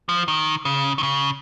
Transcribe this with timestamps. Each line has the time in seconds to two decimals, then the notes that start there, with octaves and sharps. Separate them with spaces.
0.09 F3
0.28 D#3
0.65 C#3
0.98 D#3
1.03 C#3